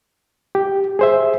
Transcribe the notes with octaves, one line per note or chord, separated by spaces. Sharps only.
G4
G#4 C5 E5